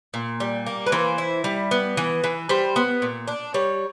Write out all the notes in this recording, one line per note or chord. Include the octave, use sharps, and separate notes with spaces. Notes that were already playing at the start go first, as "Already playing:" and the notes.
A#2
G3
A#3
B4
E3 C5
E4
G3
B3
E3
E3
G3 C5
B3
A#2
D4
G3 C#5